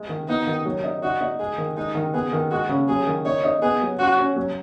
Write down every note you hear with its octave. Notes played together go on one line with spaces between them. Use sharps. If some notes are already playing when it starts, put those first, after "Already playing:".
Already playing: G#3
D#3
B3 D#4
D#3
F#3
D#4
D#4 F#4
D#4
G#3 G#4
D#3
G#3 D#4
D#3
B3 G#4
D#3
G#3 F#4
C#3
F#3 G#4
D#3
D#4 C#5
D#4
B3 G#4
F#3
C#4 F#4
C#4
F#3